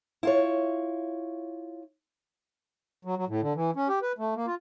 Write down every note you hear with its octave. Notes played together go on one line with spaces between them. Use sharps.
E4 F4 C#5
F#3
F#3
A2
D3
E3
C#4
G4
B4
A3
A#3
F4